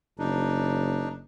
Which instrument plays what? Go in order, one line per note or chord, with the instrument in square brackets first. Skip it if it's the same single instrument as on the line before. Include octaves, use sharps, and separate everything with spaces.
[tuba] F#1 [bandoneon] D4 D#4